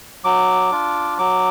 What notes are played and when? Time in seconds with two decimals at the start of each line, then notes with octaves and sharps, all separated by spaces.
0.24 F#3 D6
0.71 D4 F4
1.18 F#3 D6